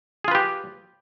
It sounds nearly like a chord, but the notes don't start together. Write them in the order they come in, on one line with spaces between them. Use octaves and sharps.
G#4 F4 B4 G4